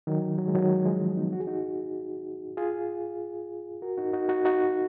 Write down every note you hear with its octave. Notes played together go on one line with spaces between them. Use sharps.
D#3 F#3
F#3
G#3
D#3 F#3
F3 G#3
B3 D#4
F#4
G#4
D#4 F#4
F4 G#4
F#4 A#4
D#4 F#4
D#4 F#4
D#4 F#4
D#4 F#4